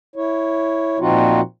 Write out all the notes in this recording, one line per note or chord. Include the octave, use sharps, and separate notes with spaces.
E4 C#5
A#2 F3 C4 D#4 F4 F#4